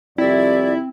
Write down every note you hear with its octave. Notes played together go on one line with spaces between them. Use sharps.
C2 F2 C3 C4 E4 D5